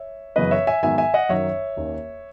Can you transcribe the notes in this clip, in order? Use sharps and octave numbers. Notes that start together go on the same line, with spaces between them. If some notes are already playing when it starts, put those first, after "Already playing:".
Already playing: C#5 E5
F#2 C#3 E3 B3 B4 D#5
C#5 E5
E5 G#5
G#2 D#3 F#3 B3 E5 G#5
E5 G#5
D#5 F#5
F#2 D#3 F#3 C#4 C#5 E5
D#2 D#3 A#3 C#4